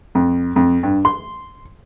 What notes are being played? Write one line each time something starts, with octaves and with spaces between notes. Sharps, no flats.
F2
F2
G2
C6